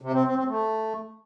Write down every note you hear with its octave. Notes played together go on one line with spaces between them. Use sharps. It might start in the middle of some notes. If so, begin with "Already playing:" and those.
C3
C4
C4
C4
A3